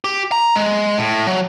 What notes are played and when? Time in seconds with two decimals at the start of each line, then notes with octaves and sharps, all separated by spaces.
0.04 G4
0.32 A#5
0.56 G#3
0.98 A2
1.27 F#3